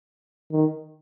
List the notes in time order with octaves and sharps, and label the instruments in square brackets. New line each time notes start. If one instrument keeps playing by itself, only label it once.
[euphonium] D#3